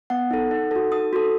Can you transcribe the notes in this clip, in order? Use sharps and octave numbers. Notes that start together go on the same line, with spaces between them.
B3 F#5
D#4 A4
D#4
F#4 A4
D#4 D#6
F#4 A4